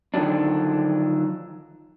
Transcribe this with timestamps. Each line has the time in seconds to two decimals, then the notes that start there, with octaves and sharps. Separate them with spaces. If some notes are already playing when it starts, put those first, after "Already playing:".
0.14 D3 D#3 F3 F#3 D4